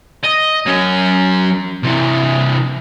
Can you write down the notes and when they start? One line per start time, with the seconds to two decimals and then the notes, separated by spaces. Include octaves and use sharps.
0.23 D#5
0.66 F#3 C#4
1.83 C3 E3